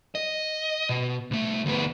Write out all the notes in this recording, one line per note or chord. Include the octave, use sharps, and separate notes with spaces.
D#5
B2
C2 A3
D2 B3